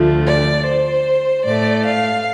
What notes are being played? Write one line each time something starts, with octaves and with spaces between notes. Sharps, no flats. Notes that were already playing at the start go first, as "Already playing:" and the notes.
Already playing: D2 D3 F3 A3
D5
C5
A2 A3 D5
F5